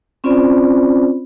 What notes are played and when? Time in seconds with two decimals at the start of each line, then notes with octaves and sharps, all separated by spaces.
0.24 C4 C#4 F4 C5 D5 B5